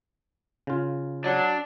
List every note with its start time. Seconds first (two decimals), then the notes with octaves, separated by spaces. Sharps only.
0.67 C#3 F4
1.24 F#3 D4